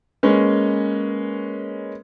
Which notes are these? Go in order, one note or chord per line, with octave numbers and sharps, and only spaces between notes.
G#3 A#3 C#4 B4